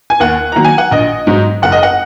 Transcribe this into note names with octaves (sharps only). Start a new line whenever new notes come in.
G#5
D#2 F#5
D#3 F#3 A#3 A#5
G#5
F#5
A#1 D#5
G#2 F#3
F#1 F#5
D#5
F#5